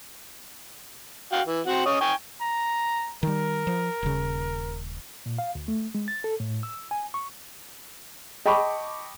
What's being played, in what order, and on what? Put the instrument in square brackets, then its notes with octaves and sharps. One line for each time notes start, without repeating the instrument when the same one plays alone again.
[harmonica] F#4 F5 G5
E3
C4 F#4 F#5
C#4 C#5 D#5
G5 G#5 C#6
[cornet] A#5
[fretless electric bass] D#3 G3 [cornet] A#4
[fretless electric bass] F3
D#1 C#3
[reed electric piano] A#2
F5
D2
A3
G#3
A6
A4
A2
E6
G#5
C#6
[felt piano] D#5 G5 A5 B5 C#6 D6